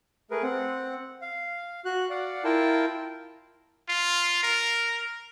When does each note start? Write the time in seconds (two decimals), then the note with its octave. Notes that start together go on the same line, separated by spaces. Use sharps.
0.31 A3 G#4 A#4 B4
0.43 C4 F#5
1.22 F5
1.85 F#4 F#6
2.10 D5 F5 F#5
2.44 E4 F4 A#4 G5 A5
3.89 F4
4.43 A#4